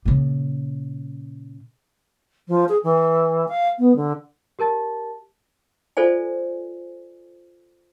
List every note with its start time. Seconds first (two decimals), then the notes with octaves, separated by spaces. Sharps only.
0.05 A#2 C#3
2.48 F3
2.68 G#4
2.83 E3
3.48 F5
3.78 B3
3.96 D3
4.59 G4 A#4 A5 A6
5.97 F4 A4 C5 D5 G#5